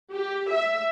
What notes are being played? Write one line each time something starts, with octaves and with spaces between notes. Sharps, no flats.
G4
E5